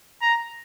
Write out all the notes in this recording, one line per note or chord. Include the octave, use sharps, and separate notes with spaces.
A#5